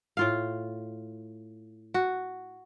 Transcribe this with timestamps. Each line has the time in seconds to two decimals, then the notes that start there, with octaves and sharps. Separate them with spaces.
0.17 A2 F4 F5
1.94 F#4